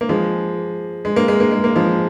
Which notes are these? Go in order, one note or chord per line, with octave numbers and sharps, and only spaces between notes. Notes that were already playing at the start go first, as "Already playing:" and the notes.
A#3
F3 G#3
G#3
A#3
G#3
A#3
G#3
A#3
F3 G#3